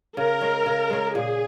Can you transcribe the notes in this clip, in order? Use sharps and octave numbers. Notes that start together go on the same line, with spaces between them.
C#3 A#4
G#3 C#4
C#3
G#3 C#4
A#2 G#4